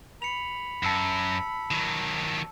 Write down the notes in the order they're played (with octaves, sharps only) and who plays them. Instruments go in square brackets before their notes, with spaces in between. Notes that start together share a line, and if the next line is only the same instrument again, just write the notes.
[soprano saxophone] B5 [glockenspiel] C#7 F7
[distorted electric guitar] F#2 [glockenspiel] A5 E6 C#7
[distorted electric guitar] D#3 F#3